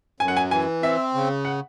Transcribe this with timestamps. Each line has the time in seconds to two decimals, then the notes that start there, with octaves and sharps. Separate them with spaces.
0.20 F#2 G#5
0.28 F#5
0.37 G#5
0.51 E3 G#5
0.83 C4 E5
1.14 C#3
1.45 F#5